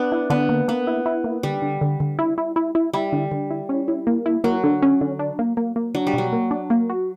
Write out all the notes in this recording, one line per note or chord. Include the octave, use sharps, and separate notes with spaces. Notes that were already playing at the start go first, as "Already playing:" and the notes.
Already playing: B3 D4
E4
D3 B3
A#3
A#3 B3
E4
E4
A#3
D3 G3
D3
D3
D3
E4
E4
E4
E4
G3 E4
D3
D3
E4
C#4
E4
A#3
E4
F#3 A#3
D3
C#4
D3
D4
A#3
A#3
A#3
F#3 D4
G3
B2 F#3
A#3
D4
A#3
F#4